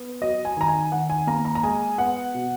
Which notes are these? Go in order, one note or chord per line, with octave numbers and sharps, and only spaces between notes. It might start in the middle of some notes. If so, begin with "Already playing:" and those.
Already playing: B3
F#3 D#5
G#5
D#3 A#5
G#5
D#3 F#5
G#5
A#3 A#5
A#5
A#5
G#3 G#5
B3 F#5
B2